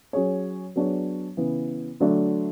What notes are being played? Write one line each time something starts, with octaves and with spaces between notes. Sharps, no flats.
F#3 C#4 G#4 C#5
F#3 B3 D4 G#4 C#5
C#3 E3 B3
D3 F#3 A3 D4